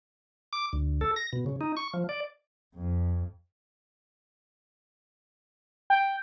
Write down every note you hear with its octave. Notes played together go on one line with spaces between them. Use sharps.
D6
D2
A4
A#6
B2
C#3
D#4
C#6
F3
D5
F2
G5